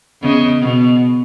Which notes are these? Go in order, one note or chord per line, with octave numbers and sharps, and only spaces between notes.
E2 C#3 D#5
B2